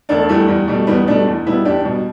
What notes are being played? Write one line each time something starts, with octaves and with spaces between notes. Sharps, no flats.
E1 A3 D4
E2 E3 G3 A3
E2 G3
B2 G3 A3
E2 G3 B3
B2 G3 A3 D4
E2
B2 G3 B3 E4
E2 D4 G4
B2 G3